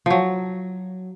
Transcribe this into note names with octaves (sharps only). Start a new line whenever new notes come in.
F3 F#3